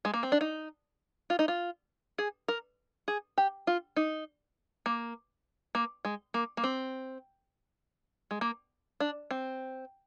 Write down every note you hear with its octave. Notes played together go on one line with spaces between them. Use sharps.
G#3
A#3
C4
D4
D#4
F4
D#4
F4
G#4
A#4
G#4
G4
F4
D#4
A#3
A#3
G#3
A#3
A#3
C4
G#3
A#3
D4
C4